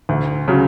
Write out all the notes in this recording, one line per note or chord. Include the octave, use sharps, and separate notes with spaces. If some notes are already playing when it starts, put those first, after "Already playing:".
D2
C#3 F#3